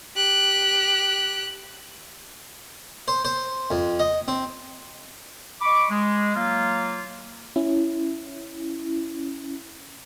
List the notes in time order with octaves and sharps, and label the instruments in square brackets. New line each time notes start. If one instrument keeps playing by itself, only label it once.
[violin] G4 F#6
[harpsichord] C5
C5
F2
D#5
C4
[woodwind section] D#5 B5 C#6 D6
G#3
F#3 A#3 F4
[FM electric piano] C#4 E4